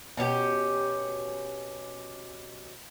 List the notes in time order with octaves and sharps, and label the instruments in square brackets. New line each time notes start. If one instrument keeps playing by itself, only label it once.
[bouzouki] B2 C#4 D4 G4